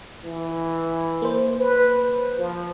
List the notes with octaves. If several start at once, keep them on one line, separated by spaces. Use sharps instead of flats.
E3
A#3 C5
B4
F3